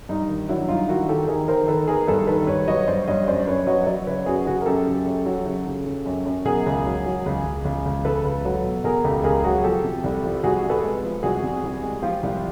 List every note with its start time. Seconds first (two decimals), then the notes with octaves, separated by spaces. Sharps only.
0.09 G2 D#4
0.28 D#3
0.48 F#3 D4 E4
0.68 G2 D#4 F4
0.89 D#3 E4 F#4
1.09 D#3 G4 A4
1.28 D#3 G#4 A#4
1.48 D#3 A#4 C5
1.68 D#3 A4 B4
1.88 D#3 G#4 A#4
2.07 G2 A4 B4
2.27 D#3 A4 B4
2.47 G2 B4 C#5
2.67 F#3 C#5 D#5
2.88 G2 C5 D5
3.07 G2 C#5 D#5
3.27 F#2 C5 D5
3.40 D5
3.47 F#2 B4 C#5
3.67 F#3 C#5 D#5
3.86 F#3 D5 E5
4.07 C#3 B4 C#5
4.26 F#2 F#4 G#4
4.46 C#3 F#4 G#4
4.61 A#4
4.66 F#2 G4 A4
4.87 C#3
5.06 F#2
5.26 F#3
5.46 C#3
5.66 C#3
5.86 C#3
6.06 F#2
6.26 F#2
6.45 B2 G#4 A#4
6.66 C#2
6.86 F#3
7.06 F#3
7.26 C#2
7.45 C#2
7.65 C#2
7.86 C#2
8.05 C#2 A4 B4
8.25 C#2
8.45 F#3
8.64 B2
8.84 B2 G#4 A#4
9.04 C#2 G4 A4
9.24 C#2 G#4 A#4
9.44 F#3 F#4 G#4
9.64 F3 G4 A4
9.84 C3
10.04 C2
10.24 F3
10.44 C2 F#4 G#4
10.63 C3
10.70 A4 B4
10.83 G#3
11.03 F3
11.23 C2 F#4 G#4
11.43 C3
11.63 C2
11.83 G#3
12.02 F3 F4 G4
12.23 C2